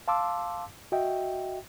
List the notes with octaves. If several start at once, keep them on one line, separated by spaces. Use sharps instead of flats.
F5 A5 C6 D6 E6
F#4 D#5 E5 G5